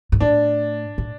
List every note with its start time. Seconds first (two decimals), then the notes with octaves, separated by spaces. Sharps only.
0.12 G#2
0.20 A2 D4
0.98 A2